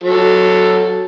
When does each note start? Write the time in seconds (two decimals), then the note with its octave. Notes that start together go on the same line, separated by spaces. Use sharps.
0.03 F#3 A4